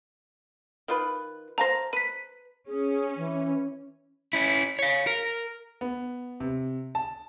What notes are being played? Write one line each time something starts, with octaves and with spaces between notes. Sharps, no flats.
D#3 F4 B4
C5 F5 A5 A#5 A#6
B4 B6 D#7
C#4 G#4
E3
C#4 E4
C#5 F5
A#4
B3
C3
A5